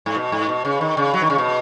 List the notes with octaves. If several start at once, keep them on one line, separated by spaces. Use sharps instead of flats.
G#2
B2
G#2
B2
C#3
D#3
C#3
F#3
D#3
C#3
B2